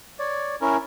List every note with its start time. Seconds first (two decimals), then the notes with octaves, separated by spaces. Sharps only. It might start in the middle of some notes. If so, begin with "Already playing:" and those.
0.19 C#5 D5
0.61 C#4 E4 A#4